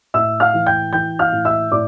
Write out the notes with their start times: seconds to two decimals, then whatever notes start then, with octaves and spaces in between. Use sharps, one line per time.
0.14 A2 E5 E6
0.40 F5 F6
0.54 E3
0.66 G5 G6
0.93 E3 G5 G6
1.19 F5 F6
1.32 A2
1.45 E5 E6
1.72 A2 D5 D6